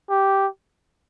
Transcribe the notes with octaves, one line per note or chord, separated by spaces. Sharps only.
G4